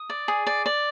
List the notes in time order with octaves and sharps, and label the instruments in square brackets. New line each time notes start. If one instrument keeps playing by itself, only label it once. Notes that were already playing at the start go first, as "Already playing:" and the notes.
Already playing: [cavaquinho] D#6
D5
G#4
D5
D5